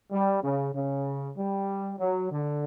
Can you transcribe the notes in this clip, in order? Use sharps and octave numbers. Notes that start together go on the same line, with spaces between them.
G3
C#3
C#3
G3
F#3
D3